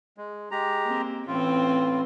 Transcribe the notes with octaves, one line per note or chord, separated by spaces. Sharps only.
G#3
G#3 G4 A#5
A#3 C4
A2 E3 C4 C#4 F4